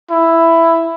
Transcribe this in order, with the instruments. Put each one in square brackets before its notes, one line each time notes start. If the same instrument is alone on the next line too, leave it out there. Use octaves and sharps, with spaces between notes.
[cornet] E4